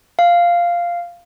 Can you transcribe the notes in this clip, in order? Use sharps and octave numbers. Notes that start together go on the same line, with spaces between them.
F5